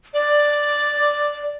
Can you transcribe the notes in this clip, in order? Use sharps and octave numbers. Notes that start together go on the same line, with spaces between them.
D5